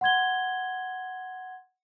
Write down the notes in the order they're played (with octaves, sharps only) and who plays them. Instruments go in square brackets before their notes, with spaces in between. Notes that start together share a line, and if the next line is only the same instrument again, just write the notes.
[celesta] F#5 C6 G#6 G7